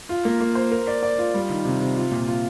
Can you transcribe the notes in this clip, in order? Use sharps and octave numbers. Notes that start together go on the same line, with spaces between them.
F4
A#3
A#3
C5
A#4
D5
D5
F4
G3
D#3
C3
C3
F4
A#2
F4